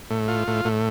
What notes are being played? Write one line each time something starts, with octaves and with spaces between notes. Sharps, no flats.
A2
F4
A2
A2